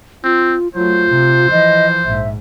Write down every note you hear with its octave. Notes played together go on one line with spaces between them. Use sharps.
C4 F4
F#3 A3 F4 C5
C3
E3 F3 D#5
A#1 G#2 E5